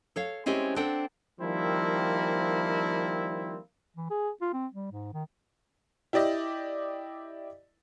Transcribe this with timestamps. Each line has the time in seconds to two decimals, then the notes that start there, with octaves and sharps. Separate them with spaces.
0.16 A4 C#5 F5
0.46 G#3 C4 C#4 E4 G4 C5
0.76 C4 D4 A4 C5 F#5 G5
1.41 D#3 F3 G3 A#3 C4 E4
3.97 E3
4.10 G#4
4.42 F4
4.54 C4
4.73 G3
4.92 G#2
5.13 D#3
6.13 E4 G4 D5 D#5